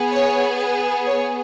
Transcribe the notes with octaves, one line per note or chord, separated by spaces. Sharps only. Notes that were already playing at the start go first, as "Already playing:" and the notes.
Already playing: B3 G#4
C#5
C#5